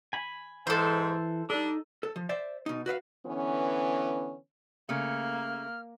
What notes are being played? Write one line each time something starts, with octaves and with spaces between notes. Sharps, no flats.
G#5 B5
G#2 E3 A4 C5
G3 D4 D#4 A4
A4
F3
C5 D5 E5
B2 D#4
F#4 B4 E5 F5
D3 E3 B3 C#4
C#3 A3 A#3 F6